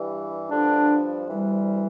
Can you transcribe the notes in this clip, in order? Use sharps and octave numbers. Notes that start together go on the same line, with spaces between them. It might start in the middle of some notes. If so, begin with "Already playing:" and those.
Already playing: G2 E3 G3
G2 D3 F3 D4
D2 C3 E3 G3